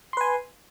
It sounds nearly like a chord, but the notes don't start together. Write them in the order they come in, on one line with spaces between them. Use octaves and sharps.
C6 B4 G#5